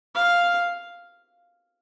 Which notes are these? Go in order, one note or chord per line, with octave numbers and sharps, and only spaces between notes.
F5